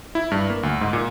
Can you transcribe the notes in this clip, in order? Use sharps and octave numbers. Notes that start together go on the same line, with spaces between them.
E4
G2
A#3
D2
G#2
A#2